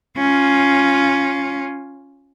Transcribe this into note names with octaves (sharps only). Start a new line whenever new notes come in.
C#4 F4